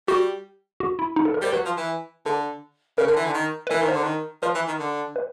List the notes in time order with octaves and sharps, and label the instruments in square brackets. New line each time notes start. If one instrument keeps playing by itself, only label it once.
[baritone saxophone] G3 [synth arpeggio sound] F#4
[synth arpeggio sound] F#4
E4
D#4
A4
A#4
[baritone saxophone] G3 [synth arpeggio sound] C5
[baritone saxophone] F#3 [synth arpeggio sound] B4
[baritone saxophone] F3
E3
[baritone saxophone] D3 [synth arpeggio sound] A4
[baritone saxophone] C#3 [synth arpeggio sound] A#4
[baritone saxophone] D3
E3
D3
D#3
[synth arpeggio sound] B4
[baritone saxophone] E3 [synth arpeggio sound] A#4
[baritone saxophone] D#3
[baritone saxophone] D3 [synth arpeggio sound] C5
[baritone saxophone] D#3
[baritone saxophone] F3 [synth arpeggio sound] B4
[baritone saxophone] E3
D#3
D3
[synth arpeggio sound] B4